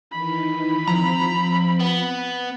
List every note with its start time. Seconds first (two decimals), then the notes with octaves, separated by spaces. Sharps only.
0.12 D#3 E3 D#4 B5
0.88 F3 C4 A#5
1.80 B3